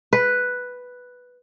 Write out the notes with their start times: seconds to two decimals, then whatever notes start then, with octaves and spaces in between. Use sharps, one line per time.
0.13 B4